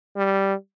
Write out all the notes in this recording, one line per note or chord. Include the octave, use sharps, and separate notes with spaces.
G3